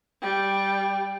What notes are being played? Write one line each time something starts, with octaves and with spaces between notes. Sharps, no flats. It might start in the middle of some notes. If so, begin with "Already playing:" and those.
G3 G5